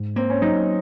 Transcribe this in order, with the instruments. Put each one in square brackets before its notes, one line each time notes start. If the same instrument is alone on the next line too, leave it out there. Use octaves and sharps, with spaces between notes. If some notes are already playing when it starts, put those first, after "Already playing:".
Already playing: [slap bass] G#2
[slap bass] A#3 [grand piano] C4
[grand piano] C#4
[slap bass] F#3 [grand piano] D#4